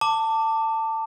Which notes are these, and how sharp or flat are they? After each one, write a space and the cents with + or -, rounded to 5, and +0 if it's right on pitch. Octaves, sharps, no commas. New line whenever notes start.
A5 +20 D6 +0